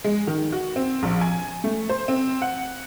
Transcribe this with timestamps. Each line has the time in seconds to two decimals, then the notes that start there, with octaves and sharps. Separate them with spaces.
0.04 G#3
0.27 D#3
0.52 F#4
0.76 C4
1.03 A#1
1.21 G#5
1.64 A3
1.90 C5
2.08 C4
2.42 F#5